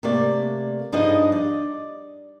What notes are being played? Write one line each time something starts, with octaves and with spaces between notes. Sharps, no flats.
C3 A3 A#3 D5
G2 F3 D4 D#4 G#4 D#5
D5